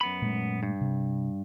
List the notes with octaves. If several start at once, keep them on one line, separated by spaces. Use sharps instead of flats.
F#2 B3 B5
A#2 G#3 A3
G2
C3